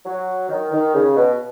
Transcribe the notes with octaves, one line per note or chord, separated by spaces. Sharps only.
F#3
D#3
D#3
C#3
B2